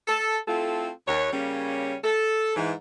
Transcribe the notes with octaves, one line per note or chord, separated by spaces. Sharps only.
A4
A3 C4 E4 F4 A4
D#2 C#5
C#3 G3 A#3 C#4
A4
G#2 E3